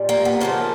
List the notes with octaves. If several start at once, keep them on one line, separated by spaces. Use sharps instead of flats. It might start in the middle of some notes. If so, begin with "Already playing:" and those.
Already playing: A#2 G3
A#3
B3
C#3 F3 A3 A#3